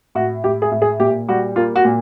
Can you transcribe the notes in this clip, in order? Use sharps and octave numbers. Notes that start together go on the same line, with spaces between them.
A2 F#4
A2 G4
G#4
A2
G#4
A#2 G4
G3 F#4
A#3 F4
F#4
A#2